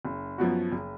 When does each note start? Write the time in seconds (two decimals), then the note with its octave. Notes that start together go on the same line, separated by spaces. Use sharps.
0.05 F#1
0.38 F#2 F3 B3 F#4
0.72 F#1